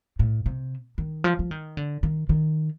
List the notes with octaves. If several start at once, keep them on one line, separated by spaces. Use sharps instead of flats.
A2
C3
D#3
F3
F3
D#3
D3
D#3
D#3